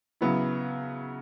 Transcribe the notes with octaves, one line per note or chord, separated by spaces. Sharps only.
C#3 F#3 B3 E4